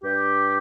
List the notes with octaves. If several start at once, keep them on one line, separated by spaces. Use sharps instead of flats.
G2 G4